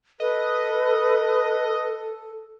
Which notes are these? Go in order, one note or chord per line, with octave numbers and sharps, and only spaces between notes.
A4 B4 D#5